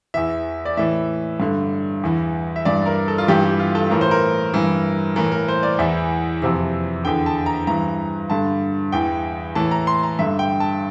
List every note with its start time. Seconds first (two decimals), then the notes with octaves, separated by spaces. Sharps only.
0.14 E2 E3 E5
0.65 D5
0.77 A2 E3 E5
1.40 G2 D3
2.03 E2 E3
2.56 E5
2.65 G2 E3 D5
2.86 A#4
3.08 A4
3.18 F4
3.28 G2 E3 G4
3.44 G4
3.59 F4
3.75 A4
3.90 A2 E3 A#4
4.01 C5
4.11 A#4
4.54 G2 E3
5.16 A2 E3 A#4
5.32 A#4
5.48 C5
5.63 D5
5.79 E2 E3 E5
6.42 F2 C3 E3
7.05 E2 D3 G5
7.26 A5
7.46 A#5
7.67 G2 E3 A#5
8.30 G2 D3 A5
8.92 E2 E3 G5
9.55 A2 E3 A5
9.71 A#5
9.87 C6
10.03 A#5
10.19 G2 D3 E5
10.39 G5
10.60 A5